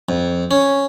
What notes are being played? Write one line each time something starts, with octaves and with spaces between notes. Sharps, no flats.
F2
C#4